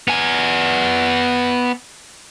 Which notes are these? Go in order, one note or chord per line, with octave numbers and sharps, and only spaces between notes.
B3 G#5